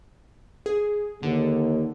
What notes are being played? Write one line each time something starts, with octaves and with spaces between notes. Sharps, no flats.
G#4
D#2 D3